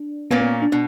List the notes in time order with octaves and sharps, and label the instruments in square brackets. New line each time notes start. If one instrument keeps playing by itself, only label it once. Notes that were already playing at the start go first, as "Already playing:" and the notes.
Already playing: [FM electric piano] D4
[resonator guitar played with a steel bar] A#2 A#3 C#4 [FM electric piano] B3
[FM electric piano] B3
D4
[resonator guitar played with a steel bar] B2 [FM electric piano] D4